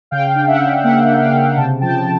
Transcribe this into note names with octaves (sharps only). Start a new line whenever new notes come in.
C#3 F5 G5
D4
E5 F#5
C#3
A#3 E5 F#5
D4
F5 G5
C#3
C3 G5 A5
F3 G5 A5